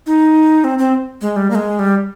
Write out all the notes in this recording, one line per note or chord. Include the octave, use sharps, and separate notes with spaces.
D#4
C4
C4
G#3
G3
A#3
G#3
G3